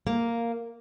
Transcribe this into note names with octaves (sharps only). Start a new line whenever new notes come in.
A#3